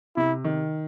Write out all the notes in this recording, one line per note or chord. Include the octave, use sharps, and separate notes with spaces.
C3 E4
D#3